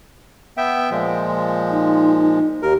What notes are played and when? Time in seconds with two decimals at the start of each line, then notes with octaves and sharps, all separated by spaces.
0.57 B3 E5 G5
0.91 A#2 F3 G#3
1.71 D#4
2.62 D#2 G4 A#4